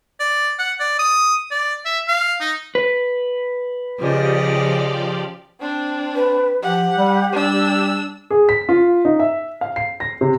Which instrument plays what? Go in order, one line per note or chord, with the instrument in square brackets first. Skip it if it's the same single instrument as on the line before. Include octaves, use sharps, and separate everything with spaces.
[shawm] D5
F#5
D5
D#6
D5
E5
F5
D#4
[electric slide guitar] B4
[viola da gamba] C#3 D#5 [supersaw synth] F3 G4 D5
[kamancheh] C4 D4
[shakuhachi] B4
[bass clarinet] F3 [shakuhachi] G4 [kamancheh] F#5
[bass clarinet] G3
[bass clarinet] G3 [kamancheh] D4 E6
[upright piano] G#4
B6
F4
D#4
E5
F5
C7
A#6
C3